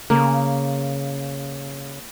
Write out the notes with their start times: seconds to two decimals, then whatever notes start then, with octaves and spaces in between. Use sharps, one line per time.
0.10 C#3 A#3